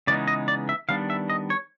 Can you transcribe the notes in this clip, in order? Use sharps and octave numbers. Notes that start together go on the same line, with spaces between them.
C#3 E3 G#3 B3 D#4 D5
D#5
D5
E5
D#3 G3 B3 D4 F5
E5
D#5
C#5